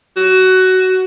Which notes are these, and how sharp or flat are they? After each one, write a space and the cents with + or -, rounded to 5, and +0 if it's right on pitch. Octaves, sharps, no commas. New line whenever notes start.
F#4 +15